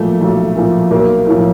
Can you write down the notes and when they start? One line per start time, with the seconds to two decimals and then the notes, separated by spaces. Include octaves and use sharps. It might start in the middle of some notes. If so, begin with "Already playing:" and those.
Already playing: B1 A#2 F3 A3
0.21 B1
0.56 A#2 F3
0.91 B1 A#3
1.26 A2 F3